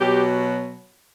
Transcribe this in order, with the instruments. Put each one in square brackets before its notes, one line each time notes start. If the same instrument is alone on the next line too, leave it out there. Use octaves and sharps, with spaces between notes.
[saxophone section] B2 F#3 G4